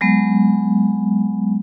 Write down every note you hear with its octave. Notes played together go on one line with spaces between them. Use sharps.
F#3 G#3 B3